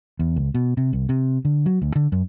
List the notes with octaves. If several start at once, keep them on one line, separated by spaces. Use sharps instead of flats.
E2
C#2
B2
C3
C2
C3
D3
F#3
D2
D3
F#2